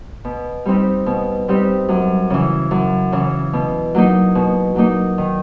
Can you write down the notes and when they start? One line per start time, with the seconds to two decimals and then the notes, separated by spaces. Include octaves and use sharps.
0.25 B2
0.66 G3 C4 D#4 G4
1.06 B2
1.48 G3 C4 D#4 G4
1.88 F#2
2.30 C#3 E3
2.71 F#2
3.12 C#3 E3
3.53 B2
3.95 F#3 A#3 D#4
4.35 B2
4.76 F#3 A#3 D#4
5.18 D#3